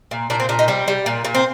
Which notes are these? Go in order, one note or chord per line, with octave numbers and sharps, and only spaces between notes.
A#2
A#2 D4
C4
A#2 D4
D#4
G3 C4
G3
A#2
A#2
C4